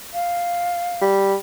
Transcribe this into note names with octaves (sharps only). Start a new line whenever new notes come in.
F5
G3